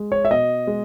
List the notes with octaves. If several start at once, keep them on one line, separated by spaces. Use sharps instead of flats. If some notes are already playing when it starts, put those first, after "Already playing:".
Already playing: G#3
C#5
E5
B2 D#5
G#3